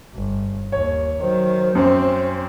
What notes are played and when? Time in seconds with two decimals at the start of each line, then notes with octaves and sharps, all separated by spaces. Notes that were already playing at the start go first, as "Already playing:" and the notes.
0.15 G1
0.72 D#2 C#5
1.21 D#3 F#3 C5
1.75 F#2 C4 C#4